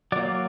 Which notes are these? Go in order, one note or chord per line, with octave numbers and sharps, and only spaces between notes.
F#3 A#3 D5